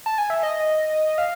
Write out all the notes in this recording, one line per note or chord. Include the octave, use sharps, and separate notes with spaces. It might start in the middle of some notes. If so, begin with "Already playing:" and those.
A5
G#5
E5
D#5
F5